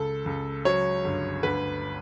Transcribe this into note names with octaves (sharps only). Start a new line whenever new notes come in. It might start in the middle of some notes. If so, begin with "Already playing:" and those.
Already playing: C#2 A4
C#2
F#3 C#5
G1
D2 B4